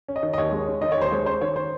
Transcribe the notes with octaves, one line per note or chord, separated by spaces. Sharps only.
C#4
D#5
D#3
D#5
D#2 C#5
G#3
C#4
D#3 D#5
C#5
D#2 C5
G#3 C#5
C#4 C5
D#3 C#5
C5